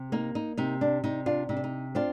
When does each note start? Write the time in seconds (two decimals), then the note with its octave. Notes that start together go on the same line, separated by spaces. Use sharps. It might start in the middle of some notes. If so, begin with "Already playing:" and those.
Already playing: C3
0.12 A#3 D#4
0.35 D#4
0.57 C3 D#4
0.81 D4
1.04 C3 D#4
1.26 D4 F4
1.49 C3 D#4
1.57 D4
1.64 D#4
1.95 C4 D4 F4